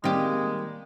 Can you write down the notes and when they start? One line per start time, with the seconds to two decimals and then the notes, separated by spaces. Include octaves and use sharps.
0.04 D#3 G3 G#3 A#3 C4 G4